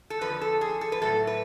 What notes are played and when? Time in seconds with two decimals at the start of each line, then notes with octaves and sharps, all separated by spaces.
0.10 A4
0.21 F2 D3 F3 B4
0.41 A4
0.61 G#4
0.81 A4
0.92 B4
1.02 A2 F#3 A3 A4
1.27 B4